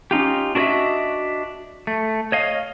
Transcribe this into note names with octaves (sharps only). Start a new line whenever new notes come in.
C#4 D#4 F4 G4
D4 F#4 A#4 C#5 D#5 E5
A3
C#5 D#5 F5